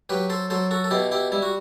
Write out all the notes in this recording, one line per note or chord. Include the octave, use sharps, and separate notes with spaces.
F#3 G4 B4
A4 C5
F#3 A4 C5
F#4 A4
A4
B2 E4 G4
E4 G4
G3 E4
F#4